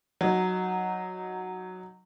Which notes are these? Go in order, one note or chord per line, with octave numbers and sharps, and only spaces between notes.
F#3 D#4